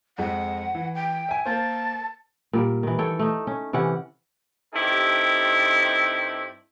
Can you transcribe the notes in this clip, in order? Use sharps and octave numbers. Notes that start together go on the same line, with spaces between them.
F2 G#3 F#5
E3
G5
E5 G#5
A#3 C5 A5
A#2 G3 A#4
D#3 E3
A4 C#5 G5
A3 D#4
C#4
C3 E3 C#4 F#5
G2 C4 D#4 E4 G4 A4